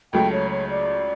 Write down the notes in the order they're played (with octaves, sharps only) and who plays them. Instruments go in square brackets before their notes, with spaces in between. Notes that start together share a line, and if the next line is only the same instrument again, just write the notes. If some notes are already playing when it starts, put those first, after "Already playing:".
[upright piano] C#2 C#3 F#3 A3 [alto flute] G5
[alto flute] C#5
C#5
D5